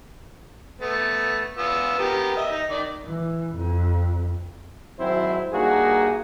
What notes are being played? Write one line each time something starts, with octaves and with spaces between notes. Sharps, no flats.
A3 B3
B3 F4 E6
B3 G4 A#4
D#5 E5
D#4
D#3 D5
E3
F2
G#1 F#3 C4 E4 C5
G2 A#3 D#4 F#4 G#4